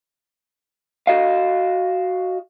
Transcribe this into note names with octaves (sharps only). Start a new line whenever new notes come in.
F#4 D#5 F5